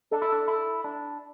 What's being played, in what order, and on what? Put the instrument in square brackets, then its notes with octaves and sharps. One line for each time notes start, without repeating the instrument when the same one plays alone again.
[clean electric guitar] D4 [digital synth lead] A4
[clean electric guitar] E4
D4
E4
D4